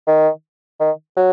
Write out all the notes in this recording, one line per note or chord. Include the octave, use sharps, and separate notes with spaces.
D#3
D#3
F#3